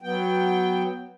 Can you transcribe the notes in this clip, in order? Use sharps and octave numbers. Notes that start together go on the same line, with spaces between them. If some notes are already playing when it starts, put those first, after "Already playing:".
F#3 B3 G5